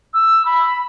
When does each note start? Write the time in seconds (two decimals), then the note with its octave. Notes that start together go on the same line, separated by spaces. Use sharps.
0.14 E6
0.45 B5